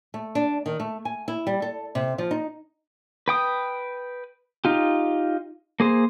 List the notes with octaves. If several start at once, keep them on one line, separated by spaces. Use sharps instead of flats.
A3
D4
D#3
A3
G#5
E4
G3
A4
C3
F3
D#4
B4 G5 D#6
D#4 F4 G4
A#3 G#4 C5